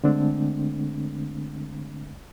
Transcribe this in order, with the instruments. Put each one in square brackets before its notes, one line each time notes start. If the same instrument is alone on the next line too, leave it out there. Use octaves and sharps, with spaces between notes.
[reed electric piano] D3 G#3 A3 C4 D4